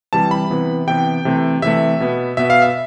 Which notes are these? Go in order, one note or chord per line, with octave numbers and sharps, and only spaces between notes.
C3 E3 G3 A5
B5
C3 E3 B3
C3 E3 B3 G5
C3 E3 A3
C3 E3 A3 E5
B2 B3
B2 B3 E5
F5
E5